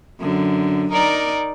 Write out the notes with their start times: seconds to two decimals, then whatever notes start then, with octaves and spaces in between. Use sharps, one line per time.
0.20 F#2 D3
0.92 D#4 A#4 D5